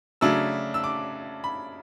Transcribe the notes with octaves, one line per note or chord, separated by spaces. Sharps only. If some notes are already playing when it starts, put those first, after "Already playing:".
C#3 F#3 A3 D4 E6
E6
D6
B5